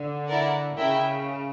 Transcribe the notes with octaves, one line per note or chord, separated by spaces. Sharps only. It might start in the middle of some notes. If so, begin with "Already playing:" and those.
Already playing: D3
E4 A#4 D5 F#5
C#3 E4 A#4 E5 G5